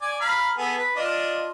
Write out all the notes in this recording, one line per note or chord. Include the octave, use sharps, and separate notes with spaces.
D5 G#5
F5 A#5 B5
B3 G#4 A4
B4
D4 F4 D#5